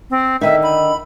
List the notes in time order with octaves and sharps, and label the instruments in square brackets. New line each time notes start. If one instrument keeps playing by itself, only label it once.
[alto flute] C4
[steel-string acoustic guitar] D3 D#3 D#4 [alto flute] E5
[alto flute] B5